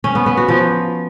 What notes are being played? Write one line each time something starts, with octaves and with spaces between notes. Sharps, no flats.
C#4
B3
B3
F#4
F3